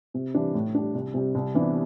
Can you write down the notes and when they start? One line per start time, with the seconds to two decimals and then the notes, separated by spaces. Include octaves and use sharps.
0.14 C3
0.34 E3 G3 D4
0.54 A2
0.75 G3 D4
0.94 C2
1.14 C3 G3
1.35 C2
1.55 C3 E3 B3 D4